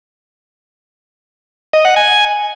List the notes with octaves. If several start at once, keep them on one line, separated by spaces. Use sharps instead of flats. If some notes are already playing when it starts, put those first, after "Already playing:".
D#5
F#5
G#5